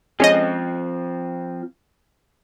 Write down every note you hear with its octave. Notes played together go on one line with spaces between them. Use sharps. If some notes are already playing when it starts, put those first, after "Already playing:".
F3 G#3 C4 C#4 D#5